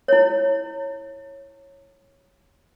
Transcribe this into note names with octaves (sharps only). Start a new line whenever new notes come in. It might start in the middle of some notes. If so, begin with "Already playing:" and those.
E4 C#5